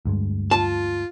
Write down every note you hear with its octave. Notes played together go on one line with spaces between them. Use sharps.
D2 G2 G#3
F4 A5